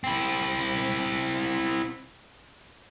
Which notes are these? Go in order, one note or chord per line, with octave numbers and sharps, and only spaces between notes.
C4 E4